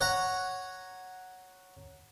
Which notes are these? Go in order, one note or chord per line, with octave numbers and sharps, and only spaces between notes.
C#5 F#5 A#5